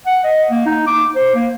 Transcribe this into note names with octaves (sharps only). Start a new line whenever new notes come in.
F#5
D#5
A#3
D#4
D6
C5
A#3